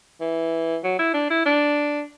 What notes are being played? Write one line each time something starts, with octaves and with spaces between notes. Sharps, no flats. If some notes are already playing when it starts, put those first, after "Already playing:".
E3
F#3
E4
D4
E4
D4